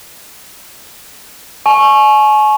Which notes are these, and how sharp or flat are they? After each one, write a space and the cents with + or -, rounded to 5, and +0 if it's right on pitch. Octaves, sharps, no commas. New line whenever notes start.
G#5 +40 C#6 -15